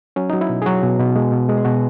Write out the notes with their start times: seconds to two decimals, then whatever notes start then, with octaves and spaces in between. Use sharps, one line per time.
0.16 F#3 C#4
0.30 F#3 D#4
0.41 E4
0.49 B2
0.62 G#4
0.66 F#3 F#4
0.83 B2
0.99 B2
1.16 G#3
1.32 B2
1.49 G#3
1.57 G#4
1.65 B2 F#4